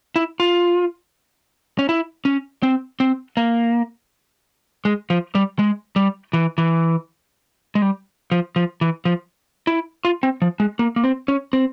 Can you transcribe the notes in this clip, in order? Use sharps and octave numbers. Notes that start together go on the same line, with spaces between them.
E4
F4
C#4
E4
C#4
C4
C4
A#3
G#3
F3
G3
G#3
G3
E3
E3
G#3
G3
F3
F3
E3
F3
E4
F4
C4
F3
G#3
A#3
A#3
C4
C#4
C4